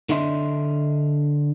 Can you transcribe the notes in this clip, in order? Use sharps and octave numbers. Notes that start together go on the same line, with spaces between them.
D3 D4 D#5 E5 C6